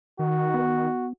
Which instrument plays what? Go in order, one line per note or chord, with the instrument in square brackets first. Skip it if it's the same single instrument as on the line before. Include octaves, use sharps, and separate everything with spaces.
[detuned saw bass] D#3 [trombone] F#4
[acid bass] B3